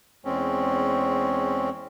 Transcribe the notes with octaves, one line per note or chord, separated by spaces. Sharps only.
E2 G#3 C4 C#4